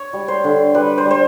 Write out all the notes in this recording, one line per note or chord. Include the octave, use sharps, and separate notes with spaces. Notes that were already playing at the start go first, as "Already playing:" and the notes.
Already playing: C#5
G3
C5
D3
G3 B4
C5
G3
C5